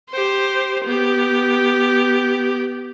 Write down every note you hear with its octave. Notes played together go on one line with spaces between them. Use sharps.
G4 C5
B3 G4